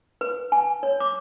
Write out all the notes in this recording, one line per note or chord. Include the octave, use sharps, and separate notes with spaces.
B4
G#5
C#5
D6